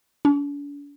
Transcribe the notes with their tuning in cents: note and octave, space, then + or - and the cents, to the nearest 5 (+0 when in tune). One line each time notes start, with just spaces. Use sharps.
D4 -45